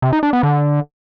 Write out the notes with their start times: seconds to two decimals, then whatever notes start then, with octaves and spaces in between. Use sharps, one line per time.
0.02 C3
0.13 D#4
0.23 D4
0.33 B3
0.43 D3